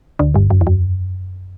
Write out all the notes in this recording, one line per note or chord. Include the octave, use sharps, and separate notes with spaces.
D2 D3
G1 G2
F#2
E2
F#2